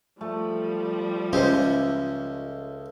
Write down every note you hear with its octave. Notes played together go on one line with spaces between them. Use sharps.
F3 G3 A3
C#2 G#3 C#4 G4 C5 E5